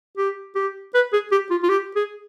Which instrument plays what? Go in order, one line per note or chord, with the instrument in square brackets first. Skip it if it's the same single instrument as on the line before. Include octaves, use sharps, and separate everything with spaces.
[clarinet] G4
G4
B4
G#4
G4
F4
F4
G4
G#4